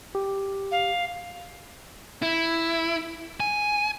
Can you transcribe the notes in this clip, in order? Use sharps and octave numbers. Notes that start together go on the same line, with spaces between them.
G4
F5
E4
G#5